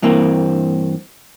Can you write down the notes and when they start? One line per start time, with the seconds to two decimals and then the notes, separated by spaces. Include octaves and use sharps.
0.02 G2 E3 A#3 C4